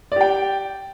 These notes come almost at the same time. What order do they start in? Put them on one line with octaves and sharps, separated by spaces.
D5 G4 G5